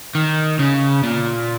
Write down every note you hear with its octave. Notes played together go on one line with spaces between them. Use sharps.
D#3
C#3
A#2